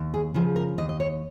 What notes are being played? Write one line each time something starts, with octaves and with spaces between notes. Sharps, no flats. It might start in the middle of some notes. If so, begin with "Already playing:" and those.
Already playing: D#2
G#4
C#3 F3 G#4
A#4
D#2 D#5
D#5
C#5